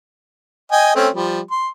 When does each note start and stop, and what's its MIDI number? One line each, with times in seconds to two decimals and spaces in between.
0.72 0.95 75
0.72 0.95 79
0.72 0.95 80
0.95 1.09 57
0.95 1.09 60
0.95 1.09 61
1.14 1.40 53
1.14 1.40 55
1.51 1.68 84